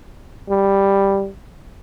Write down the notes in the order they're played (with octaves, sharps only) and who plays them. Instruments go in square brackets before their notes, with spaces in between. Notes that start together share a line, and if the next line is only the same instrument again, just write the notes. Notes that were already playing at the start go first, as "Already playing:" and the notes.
[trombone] G3